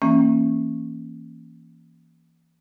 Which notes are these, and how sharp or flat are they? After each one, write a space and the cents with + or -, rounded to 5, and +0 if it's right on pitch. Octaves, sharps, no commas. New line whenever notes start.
E3 +5 A#3 -5 C#4 -20